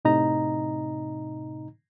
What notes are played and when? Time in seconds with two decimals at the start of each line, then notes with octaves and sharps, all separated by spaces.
0.05 A2 C3 D#4 D#5 A#5